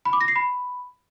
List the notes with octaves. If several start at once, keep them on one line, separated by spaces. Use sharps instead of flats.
B5
D6
A#6
C7
B5